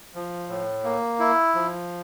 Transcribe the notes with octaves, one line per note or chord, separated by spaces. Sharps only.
F3
A2
A#3
E4
F3